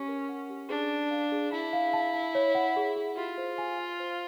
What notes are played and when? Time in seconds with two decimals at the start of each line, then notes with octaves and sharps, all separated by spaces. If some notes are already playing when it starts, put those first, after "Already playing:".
Already playing: C#4 G4
0.08 A#4
0.29 F#5
0.50 G4
0.69 D4 G#4
0.90 G#4
1.11 F5
1.32 G#4
1.52 E4 A5
1.73 F5
1.93 A5
2.14 A5
2.35 C#5
2.55 F#5
2.76 G#4
2.96 G#4
3.17 F4 G4
3.38 C5
3.58 G#5
3.79 F5
4.00 C5